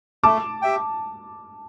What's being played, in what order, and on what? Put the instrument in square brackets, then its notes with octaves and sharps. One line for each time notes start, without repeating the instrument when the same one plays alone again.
[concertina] A3 [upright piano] A5 D6
[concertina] G4 E5 G5